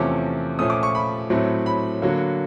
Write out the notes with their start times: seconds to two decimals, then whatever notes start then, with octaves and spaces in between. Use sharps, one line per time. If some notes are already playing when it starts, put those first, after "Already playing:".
Already playing: E2 C3 F3 A3 C#4 D6
0.59 A#2 F3 A3 C#4 D#6
0.70 D6
0.83 C#6
0.95 B5
1.30 A2 F#3 A3 C4
1.66 B5
2.02 D3 F#3 A#3